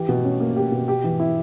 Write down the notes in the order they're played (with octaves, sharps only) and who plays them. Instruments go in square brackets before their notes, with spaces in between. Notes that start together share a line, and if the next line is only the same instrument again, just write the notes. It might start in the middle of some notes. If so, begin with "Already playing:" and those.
Already playing: [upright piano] E3 G4
B2
C#4
A#3
G4
B2
G4
E3
E4